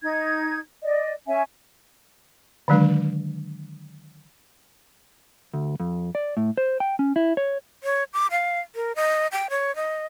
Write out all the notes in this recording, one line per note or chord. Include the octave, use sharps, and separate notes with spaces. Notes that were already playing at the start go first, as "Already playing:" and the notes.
D#4 G#6
D5 D#5
C#4 E5 G#5
D3 D#3 F#3 G#3 D4
D2
F2
D5
A2
C5
G5
C#4
E4
C#5
C#5
D6
F5
A#4
D#5
G5
C#5
D#5